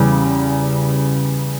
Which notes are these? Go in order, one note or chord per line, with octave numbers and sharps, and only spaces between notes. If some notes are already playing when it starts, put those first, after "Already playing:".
Already playing: E2 C#3 G3